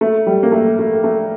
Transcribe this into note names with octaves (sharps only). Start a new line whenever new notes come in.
A3
G3
A#3
A3
A3
A3